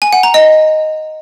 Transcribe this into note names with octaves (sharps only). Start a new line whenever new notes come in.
G#5
F#5
A#5
D#5